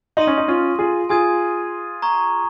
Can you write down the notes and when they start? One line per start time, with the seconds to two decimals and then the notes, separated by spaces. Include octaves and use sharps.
0.17 D#4 C6 D#6 A#6 D#7
0.27 C#4
0.38 D#4
0.48 C#4 F4
0.79 F4 G#4
1.09 F4 G#4 G#5 D#6 G#6 D#7
2.02 A#5 C#6 G#6